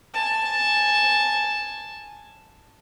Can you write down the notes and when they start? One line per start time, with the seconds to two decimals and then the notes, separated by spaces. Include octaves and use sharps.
0.14 G#5 A5